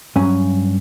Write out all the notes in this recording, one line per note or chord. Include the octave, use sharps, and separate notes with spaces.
G2 F#3 C#4 G#5